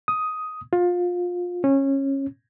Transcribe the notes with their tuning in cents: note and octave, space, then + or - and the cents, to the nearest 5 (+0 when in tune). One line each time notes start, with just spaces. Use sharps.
D#6 +10
F4 +25
C#4 -20